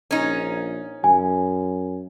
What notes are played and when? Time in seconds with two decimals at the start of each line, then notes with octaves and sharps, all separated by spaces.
0.11 A#1 C#4 D#4
1.04 F#2 G#5